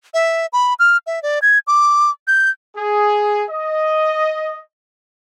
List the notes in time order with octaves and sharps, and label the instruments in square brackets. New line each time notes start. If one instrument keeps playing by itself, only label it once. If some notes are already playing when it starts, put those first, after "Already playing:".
[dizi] E5
B5
F6
E5
D5
G#6
D6
G6
[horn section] G#4
D#5